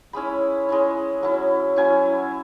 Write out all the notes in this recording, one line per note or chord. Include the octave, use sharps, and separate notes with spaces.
G#3 C#4 E4 B5
G#3 C#4 E4
F#3 C#4 E4
F#3 C#4 E4 G#5